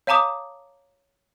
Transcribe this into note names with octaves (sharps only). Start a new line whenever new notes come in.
C#5 F5 A5 A#5 D6 D#6